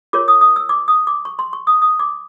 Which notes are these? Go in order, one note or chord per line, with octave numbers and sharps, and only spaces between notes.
F4 A#4 C#5 D6
D#6
D#6
E6
D6
D#6
D6
C#6
C6
C#6
D#6
D#6
D6